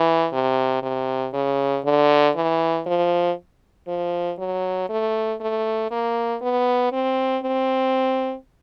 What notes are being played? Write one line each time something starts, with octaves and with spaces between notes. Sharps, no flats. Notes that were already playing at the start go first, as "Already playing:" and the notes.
Already playing: E3
C3
C3
C#3
D3
E3
F3
F3
F#3
A3
A3
A#3
B3
C4
C4